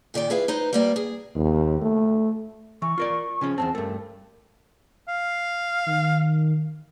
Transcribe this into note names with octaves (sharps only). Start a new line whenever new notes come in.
A#2 D#3 D5 G5
E4 G#4 B4 E5 F5
D#4 B4 C5
G3 A#3 D5 G5
G#4
D#2
A3
E3 C#6
F4 A#4 D5
C#3 F3 C#4
E2 G2 C4 A5
G2 A3 A#4
F5
D#3